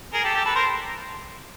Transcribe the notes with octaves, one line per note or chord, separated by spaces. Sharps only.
G#4 A#4
G4 A4
G4 A4
A4 B4
A#4 C5